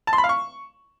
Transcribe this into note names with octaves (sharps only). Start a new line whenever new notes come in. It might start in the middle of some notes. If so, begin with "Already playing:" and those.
A5
C6
B5
F5
C#6